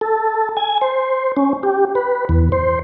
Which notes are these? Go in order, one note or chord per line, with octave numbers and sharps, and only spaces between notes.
A4
G#5
C5
C#4
G4
B4
E2
C5